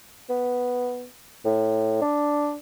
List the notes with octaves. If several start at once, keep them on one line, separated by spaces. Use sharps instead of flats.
B3
A2
D4